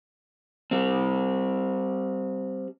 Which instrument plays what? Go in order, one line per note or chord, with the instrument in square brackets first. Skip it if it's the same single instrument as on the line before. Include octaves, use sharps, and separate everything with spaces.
[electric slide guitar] G3 C4